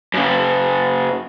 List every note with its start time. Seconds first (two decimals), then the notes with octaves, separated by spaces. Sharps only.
0.14 F#2 C#3